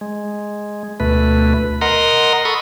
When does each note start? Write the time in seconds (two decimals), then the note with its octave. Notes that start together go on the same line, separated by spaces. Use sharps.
0.01 G#3
1.00 D2 B2 A3 B4
1.81 A#4 D#5 F#5 A#5 C6
2.45 A4 B5 C#6 D#6